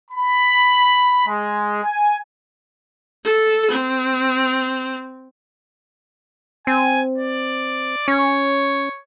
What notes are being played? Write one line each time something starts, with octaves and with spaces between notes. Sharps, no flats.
B5
G#3
G#5
A4
C4
C4 G#5
D5
C#4 C#5